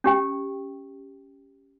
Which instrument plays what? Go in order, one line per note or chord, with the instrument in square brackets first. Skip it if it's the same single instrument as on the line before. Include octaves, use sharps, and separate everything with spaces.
[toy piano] C#4 G4 G5